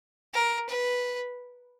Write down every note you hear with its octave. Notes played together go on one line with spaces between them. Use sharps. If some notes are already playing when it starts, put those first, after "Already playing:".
A#4
B4